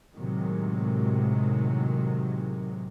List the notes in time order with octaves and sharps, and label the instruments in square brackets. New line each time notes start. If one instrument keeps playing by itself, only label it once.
[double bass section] A2 C3 D#3 F#3 G#3